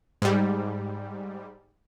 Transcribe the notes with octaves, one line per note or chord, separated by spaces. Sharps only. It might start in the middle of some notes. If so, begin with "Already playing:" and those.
G#2 G3